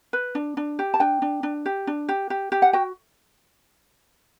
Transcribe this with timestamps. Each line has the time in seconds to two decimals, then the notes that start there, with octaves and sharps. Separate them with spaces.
0.13 B4
0.35 D4
0.57 D4
0.79 G4
0.94 A5
1.00 D4 G5
1.22 D4
1.43 D4
1.66 G4
1.87 D4
2.09 G4
2.30 G4
2.52 G4
2.62 F#5
2.73 F#4 G5